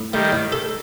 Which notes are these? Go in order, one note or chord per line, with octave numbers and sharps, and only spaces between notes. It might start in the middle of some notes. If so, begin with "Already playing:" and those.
Already playing: A2
D#3 G3 A3
A2
A4